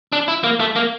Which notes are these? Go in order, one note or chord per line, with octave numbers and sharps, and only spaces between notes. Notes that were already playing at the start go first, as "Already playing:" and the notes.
D4
E4
A#3
A3
A#3